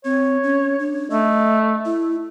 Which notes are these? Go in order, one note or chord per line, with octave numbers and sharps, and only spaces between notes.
C4 C#5
C#4
D4
A3 D#5
E4